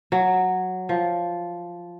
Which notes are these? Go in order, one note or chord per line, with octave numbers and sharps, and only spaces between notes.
F#3
F3